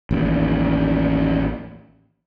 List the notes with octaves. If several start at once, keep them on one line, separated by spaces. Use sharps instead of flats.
A1 D#2